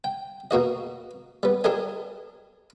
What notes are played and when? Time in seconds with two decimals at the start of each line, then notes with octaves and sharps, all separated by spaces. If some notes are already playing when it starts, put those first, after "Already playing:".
0.04 G5
0.51 B2 A#3 F#4 D#5
1.43 G3 B3
1.64 D4 G4 A4 A#4 D#5 G#5